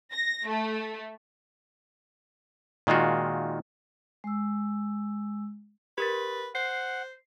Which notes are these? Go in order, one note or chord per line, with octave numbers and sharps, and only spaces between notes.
A#6
A3
A#2 D#3 G#3 F4 F#4
G#3 E6
G4 A#4 B4 A6
C5 F#5 C7